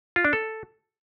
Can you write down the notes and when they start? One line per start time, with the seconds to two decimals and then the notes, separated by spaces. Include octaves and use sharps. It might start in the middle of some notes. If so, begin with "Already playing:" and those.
0.16 F4
0.25 D4
0.33 A4